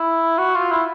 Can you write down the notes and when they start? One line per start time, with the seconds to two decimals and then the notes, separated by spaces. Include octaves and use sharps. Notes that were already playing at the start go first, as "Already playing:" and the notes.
Already playing: E4
0.38 F#4
0.55 F4
0.72 E4